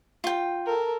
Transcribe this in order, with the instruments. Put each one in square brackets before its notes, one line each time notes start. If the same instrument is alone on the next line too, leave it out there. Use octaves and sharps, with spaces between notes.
[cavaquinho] F4 G5
[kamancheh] A4 A#4